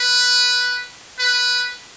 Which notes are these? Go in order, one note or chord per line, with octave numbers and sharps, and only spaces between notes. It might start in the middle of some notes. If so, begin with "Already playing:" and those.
Already playing: B4
B4